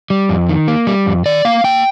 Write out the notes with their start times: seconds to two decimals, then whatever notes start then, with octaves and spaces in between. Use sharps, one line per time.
0.10 G3
0.29 F2
0.49 D#3
0.68 A#3
0.87 G3
1.06 F2
1.26 D#3 D5
1.45 A#3 F5
1.64 A#3 G5